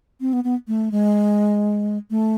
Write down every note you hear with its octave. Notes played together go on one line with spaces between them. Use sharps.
C4
B3
B3
A3
G#3
A3